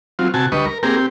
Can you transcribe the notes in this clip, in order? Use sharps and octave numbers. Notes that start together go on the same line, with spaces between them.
F#3 C4 F4
C3 F#4 G#5 A5
D2 G3 B4 D#5 C#6
A#4
A#3 C4 G4 G#4 A#4
C4 G4